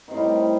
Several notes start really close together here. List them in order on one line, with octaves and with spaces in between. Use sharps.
D#3 C3 A2 G3